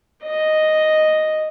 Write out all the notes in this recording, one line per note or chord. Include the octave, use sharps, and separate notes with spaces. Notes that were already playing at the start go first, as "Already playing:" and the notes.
D#5